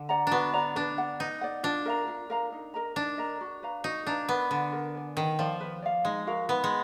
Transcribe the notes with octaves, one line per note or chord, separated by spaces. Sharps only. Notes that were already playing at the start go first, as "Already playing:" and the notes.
Already playing: D3
D5 F#5 A#5
B3 D4 F#4
D5 F#5 A#5
D4 B4
D5 F#5
D#4 B4
D5 F#5
D4 F4
A#4 F5 A#5
F4
A#4 F5 A#5
D#4
A#4 D#5 A#5
D4 D#4
A#4 D#5 A#5
F#4
B4 F5 A#5
D#4 F#4
D4 B4 F5 A#5
B3 A#4
D3 D5 G#5
A#4
D5 G#5
D#3 B4
F3 D5 F5
B4
D5 F5
G#3 D#4
F#4 A#4 F5
B3 D#4
G#3